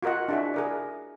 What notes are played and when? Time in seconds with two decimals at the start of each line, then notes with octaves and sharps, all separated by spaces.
0.03 F4 F#4 A#4 D#5 F#5
0.28 D4 E4 F#4 G#4 E5
0.54 G#4 A#4 D5